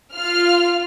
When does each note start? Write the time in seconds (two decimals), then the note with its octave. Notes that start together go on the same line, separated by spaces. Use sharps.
0.13 F4 F6